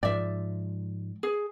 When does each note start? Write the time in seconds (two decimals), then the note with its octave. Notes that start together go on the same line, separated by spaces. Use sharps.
0.03 G#2 F3 D5 E5
1.23 G#4